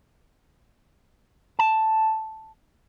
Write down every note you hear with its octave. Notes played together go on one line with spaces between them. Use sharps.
A5